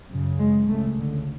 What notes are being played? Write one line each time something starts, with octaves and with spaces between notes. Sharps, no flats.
F#2 C#3
G#3
C#2 C#3 A3
D3